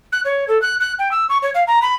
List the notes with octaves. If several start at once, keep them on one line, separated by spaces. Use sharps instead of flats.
F#6
C#5
A4
F#6
F#6
G5
E6
C#6
C#5
F5
A#5
B5